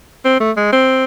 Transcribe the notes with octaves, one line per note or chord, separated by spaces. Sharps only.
C4
A3
G#3
C4